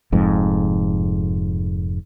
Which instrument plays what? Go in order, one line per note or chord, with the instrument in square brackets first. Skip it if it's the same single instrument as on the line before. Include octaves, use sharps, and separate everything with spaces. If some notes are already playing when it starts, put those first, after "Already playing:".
[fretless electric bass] F1 F2 G#2